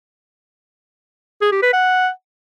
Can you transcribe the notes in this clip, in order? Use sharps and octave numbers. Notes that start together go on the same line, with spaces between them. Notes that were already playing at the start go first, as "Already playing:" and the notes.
G#4
G4
B4
F#5